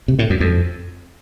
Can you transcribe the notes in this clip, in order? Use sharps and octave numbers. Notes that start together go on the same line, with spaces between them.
C3
A2
F#2
F2